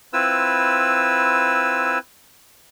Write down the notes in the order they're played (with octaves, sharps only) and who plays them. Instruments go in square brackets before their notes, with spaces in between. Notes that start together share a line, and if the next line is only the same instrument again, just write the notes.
[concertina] C4 E4 F4 B4 E6